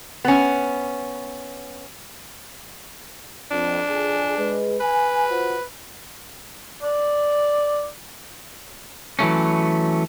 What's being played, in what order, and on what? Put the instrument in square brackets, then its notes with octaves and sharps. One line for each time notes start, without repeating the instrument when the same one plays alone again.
[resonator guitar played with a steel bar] B3 C#4
[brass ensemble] F2 [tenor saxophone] D4
[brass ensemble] F2 G#4 G#5
G#3 B4
[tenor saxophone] B4 [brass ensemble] G#5
[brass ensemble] F4 F#4 C5
[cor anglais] D5
[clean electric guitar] E3 F#3 A3 C#4